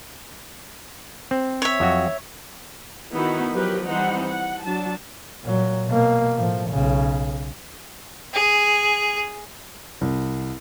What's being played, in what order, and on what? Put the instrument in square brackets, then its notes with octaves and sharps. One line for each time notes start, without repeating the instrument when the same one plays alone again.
[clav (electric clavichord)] C4
[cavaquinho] C#5 E5
[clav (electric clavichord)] F2 F#3 F#4
[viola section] D#3 B3 D#4 E4 F#4
F3 F#3 G4 A#4 B4
E3 G3 C4 D#4 C5 F#5
F#5
F#3 D4 A5
[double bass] A#2 F#3
B2 A#3
A2 F3
B1 C#3
[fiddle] G#4
[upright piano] C2